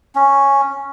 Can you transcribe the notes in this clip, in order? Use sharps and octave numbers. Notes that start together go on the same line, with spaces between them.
C#4